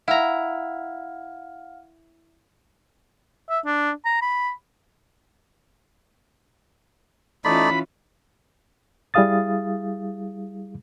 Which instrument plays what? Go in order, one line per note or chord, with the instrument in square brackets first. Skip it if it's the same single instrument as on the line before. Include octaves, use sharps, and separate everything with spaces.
[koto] E4 A#5 [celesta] F5 F#5 F6
[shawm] E5
D4
A#5
B5
[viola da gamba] E3 C#4 F4 [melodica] A3 D#4 D5 [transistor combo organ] B5
[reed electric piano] G3 E4 G#4 F5 D#6 A6